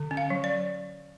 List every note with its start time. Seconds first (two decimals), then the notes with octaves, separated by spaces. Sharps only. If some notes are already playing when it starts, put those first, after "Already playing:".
Already playing: D3
0.11 C#4
0.17 F5
0.30 F#3
0.44 D5